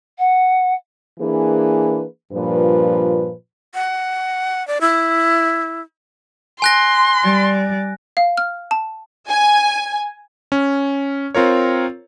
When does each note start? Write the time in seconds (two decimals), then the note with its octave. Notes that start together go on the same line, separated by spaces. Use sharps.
0.19 F#5
1.20 E3 A#3 D4 G#4 B4
2.32 G2 A#2 F3 B4
3.74 F#5
4.68 D5
4.81 E4
6.62 G#5 C6 F#6 A#6
7.24 G3 D5
8.17 F5
8.37 F6
8.71 A5
9.29 G#5
10.52 C#4
11.35 C4 F4 A#4 C#5